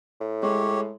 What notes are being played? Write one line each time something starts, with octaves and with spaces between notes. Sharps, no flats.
A2
G#3 G4 C#5